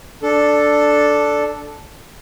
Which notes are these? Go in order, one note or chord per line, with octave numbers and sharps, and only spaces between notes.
D4 A4